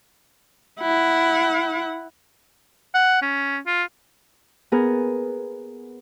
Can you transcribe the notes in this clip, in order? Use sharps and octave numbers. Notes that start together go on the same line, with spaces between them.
E4 F#5
F#5
C#4
F4
B3 G#4 A#4